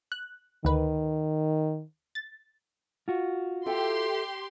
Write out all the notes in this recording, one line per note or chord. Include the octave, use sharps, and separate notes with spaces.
F#6
D2 D#3 B4
A6
F4 F#4
G4 A4 E5 G5 C6